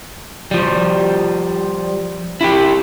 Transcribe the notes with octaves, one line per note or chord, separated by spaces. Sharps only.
F3 G3
E4 F4 G4